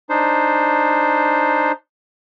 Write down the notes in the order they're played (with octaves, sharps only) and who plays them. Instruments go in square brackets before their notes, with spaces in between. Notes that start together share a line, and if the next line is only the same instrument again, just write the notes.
[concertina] D4 D#4 C5